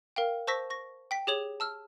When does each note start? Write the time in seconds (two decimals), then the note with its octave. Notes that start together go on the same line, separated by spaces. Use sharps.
0.16 A#4 F5 G5
0.47 C5 A5 C#6 E6 A#6 B6
0.70 C#6 A#6
1.11 G5 B6
1.27 G4 G#4 C#5 F#7
1.60 A5 E6 F6